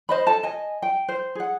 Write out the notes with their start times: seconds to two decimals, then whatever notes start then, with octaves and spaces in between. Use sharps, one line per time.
0.09 C5 D#5 B5
0.27 A4 A5
0.43 D#5 G#5
0.82 G5
1.08 C5
1.35 G#4 F#5